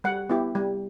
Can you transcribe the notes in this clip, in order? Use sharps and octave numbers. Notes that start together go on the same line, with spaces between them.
G3 F#5
B3 E4 G4
G3